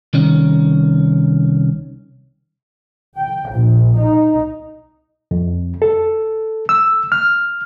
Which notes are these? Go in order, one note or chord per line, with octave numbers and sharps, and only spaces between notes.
C2 D#3 C#4
G5
A#1
D#4
F2
A4
E6
F6